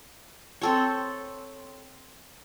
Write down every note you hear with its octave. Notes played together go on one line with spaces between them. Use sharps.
C4 A4 C#5